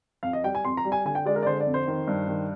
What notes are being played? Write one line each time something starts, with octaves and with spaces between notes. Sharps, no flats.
F2 F5
D#5
G3 G5
G#5
F2 C6
A#5
G3
G#5
D3 G#5
G5
G#3 D5
A#4
D5
D3 C5
D5
F2
C5
D#3
G2
D#3